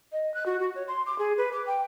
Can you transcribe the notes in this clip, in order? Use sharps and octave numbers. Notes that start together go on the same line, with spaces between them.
D#5
F#6
F#4
F#4
C#5
C6
D6
G#4
B4
D6
G5